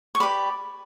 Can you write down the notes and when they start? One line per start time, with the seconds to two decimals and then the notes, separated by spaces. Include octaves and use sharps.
0.15 C#6
0.20 G4 B4 D5 B5